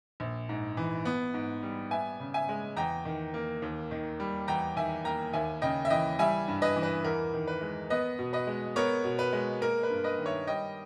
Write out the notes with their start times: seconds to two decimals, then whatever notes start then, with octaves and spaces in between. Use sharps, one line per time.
0.20 A#1
0.49 G#2
0.77 E3
1.05 B3
1.34 G#2
1.63 G3
1.91 B3 E5 G#5
2.20 C#3
2.34 E5 G#5
2.49 G#3
2.77 E2 G5 A#5
3.05 D#3
3.34 A#3
3.62 D#2
3.91 D#3
4.20 G3
4.48 E2 G5 A#5
4.76 D#3 E5 G#5
5.05 A#3 G5 A#5
5.33 D#2 E5 G#5
5.62 C#3 D#5 G5
5.85 E5
5.90 E3 D#5 G5
6.19 G3 E5 G#5
6.48 G2
6.62 B4 D#5
6.76 E3
6.83 B4
7.04 E2 A#4
7.33 D#3
7.47 B4
7.61 G#3
7.90 B3 B4 D#5
8.19 B2
8.33 B4 D#5
8.47 G#3
8.76 B3 A#4 C#5
9.04 B2
9.19 B4
9.33 G#3
9.61 A#3 A#4
9.83 B4
9.90 G2
10.04 B4 D#5
10.18 D#3
10.26 C#5 E5
10.47 G3 D#5 G5